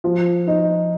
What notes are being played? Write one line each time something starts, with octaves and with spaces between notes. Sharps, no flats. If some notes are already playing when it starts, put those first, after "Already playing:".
F3
D#4